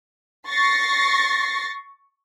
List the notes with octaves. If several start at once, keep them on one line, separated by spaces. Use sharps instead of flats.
C#6 A6 A#6 C7